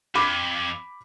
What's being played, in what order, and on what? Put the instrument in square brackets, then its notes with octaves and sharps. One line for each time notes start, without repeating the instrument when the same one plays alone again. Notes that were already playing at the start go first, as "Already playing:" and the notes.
[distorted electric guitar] F2 [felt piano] B5 D6 B6